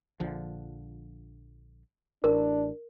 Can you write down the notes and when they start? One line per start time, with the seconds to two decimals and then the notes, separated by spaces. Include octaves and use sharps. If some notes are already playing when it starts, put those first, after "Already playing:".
0.20 A#1 D3 F3
2.24 A1 D4 A#4